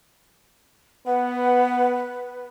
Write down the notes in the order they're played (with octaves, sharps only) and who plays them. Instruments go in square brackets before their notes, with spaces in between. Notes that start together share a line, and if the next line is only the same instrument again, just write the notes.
[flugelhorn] B3 [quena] B4 [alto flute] F#5